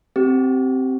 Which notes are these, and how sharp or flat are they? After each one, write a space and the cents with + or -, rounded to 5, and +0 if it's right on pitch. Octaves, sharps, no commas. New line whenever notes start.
C4 +0 G4 -20